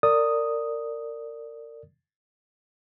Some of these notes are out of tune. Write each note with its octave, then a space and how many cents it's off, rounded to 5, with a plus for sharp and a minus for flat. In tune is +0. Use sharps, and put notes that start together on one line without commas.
A#4 -30 D5 +0 D#6 +0